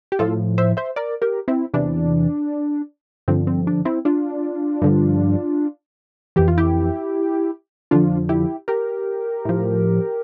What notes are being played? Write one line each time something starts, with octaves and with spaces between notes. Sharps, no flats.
G4
A2 F3 F4 A4
C5 E5
C5 E5
A#4 D5
G4 A#4
C4 E4
E2 C3 E3 D4
G2 D3 F3 C4
C4
D4
C4 E4
D4 F4
G2 D3 F3
F2 E3 G4
F4
E4 G4
F2 D3 F3 D4 F4
E4 G4
G4 A#4
A2 F3